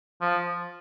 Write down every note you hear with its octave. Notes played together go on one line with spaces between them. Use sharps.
F3